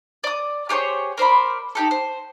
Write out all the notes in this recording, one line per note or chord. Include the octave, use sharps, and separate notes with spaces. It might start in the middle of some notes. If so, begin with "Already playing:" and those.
D5 D#6
G4 G#4 C5 C#5
A#4 C5 D5 B5
D#4 G4 A4
C5